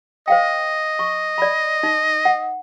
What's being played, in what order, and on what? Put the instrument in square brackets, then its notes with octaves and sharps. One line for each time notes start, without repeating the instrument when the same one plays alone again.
[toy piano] C5 F5 G5 [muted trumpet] D#5
[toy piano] C#6
D5 B5
D#4
F#5